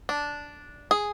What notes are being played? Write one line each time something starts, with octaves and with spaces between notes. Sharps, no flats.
D4
G#4